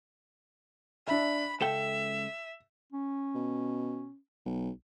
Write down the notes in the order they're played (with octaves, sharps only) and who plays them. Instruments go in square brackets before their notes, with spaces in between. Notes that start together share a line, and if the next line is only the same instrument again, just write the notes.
[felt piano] D4 E5 [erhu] B5
[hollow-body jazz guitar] C#2 A4 G5 [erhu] E5 [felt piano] E7
[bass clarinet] C#4
[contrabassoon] B2
B1